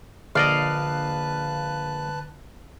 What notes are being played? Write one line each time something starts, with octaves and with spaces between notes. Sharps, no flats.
A#1 D3 B4 D5 D#5 F5 A5 F#6